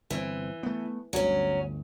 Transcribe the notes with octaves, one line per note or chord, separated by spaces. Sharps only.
G1 C#3 E3 C4
A3 B3
G1 D2 F#3 C#4